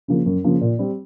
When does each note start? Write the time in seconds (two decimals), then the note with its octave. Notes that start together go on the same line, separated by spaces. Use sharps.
0.08 C#3 F3 A#3
0.26 F#2
0.44 C#3 F3 A#3
0.61 A#2
0.79 G3 C4